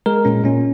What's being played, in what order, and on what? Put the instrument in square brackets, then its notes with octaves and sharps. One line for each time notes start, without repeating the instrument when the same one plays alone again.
[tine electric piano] G#3 A#4
A#2 C#4
A#2 C#4